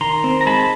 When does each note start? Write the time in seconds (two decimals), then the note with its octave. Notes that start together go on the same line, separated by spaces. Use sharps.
0.01 D#3 A#5 C6
0.24 C4
0.41 A#5
0.46 G#3 A5 B5